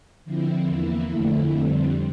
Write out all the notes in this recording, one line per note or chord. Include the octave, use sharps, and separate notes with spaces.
D3 F3 C4 E4
E2 E3 A#3 E4
F2 D3 A3 E4
F2 D3 G3 C4